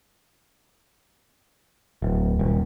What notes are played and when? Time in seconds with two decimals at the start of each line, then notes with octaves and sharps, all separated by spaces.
2.02 D1
2.39 D#1